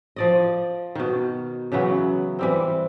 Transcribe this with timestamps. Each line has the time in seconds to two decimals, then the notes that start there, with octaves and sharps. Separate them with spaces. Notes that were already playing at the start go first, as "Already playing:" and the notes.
0.16 F3 D5 D#5
0.95 B2 D#3
1.72 C#3 E3 F#3 B3
2.39 E3 G3 C4